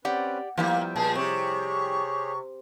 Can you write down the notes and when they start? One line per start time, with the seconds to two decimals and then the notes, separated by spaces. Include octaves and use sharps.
0.05 C4 C#4 G4 B4 D5 F#5
0.57 F3 G3 A#3 B3 E4 G5
0.96 A#2 G#4 A5
1.15 C3 G4 G#4 C#5 C#6